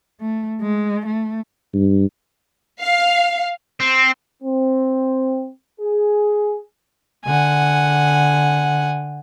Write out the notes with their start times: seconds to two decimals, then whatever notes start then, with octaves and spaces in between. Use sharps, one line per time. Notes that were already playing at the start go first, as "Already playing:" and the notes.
0.20 A3
0.62 G#3
1.06 A3
1.74 G2
2.82 F5
3.80 C4
4.43 C4
5.80 G#4
7.25 D3 F#5 G#5